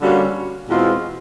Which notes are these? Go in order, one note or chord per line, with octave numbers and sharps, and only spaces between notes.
D3 G3 A#3 C#4 F#4
E2 B2 G#3 C4 F4